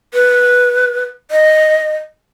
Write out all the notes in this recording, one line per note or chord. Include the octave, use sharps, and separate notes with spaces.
B4
D#5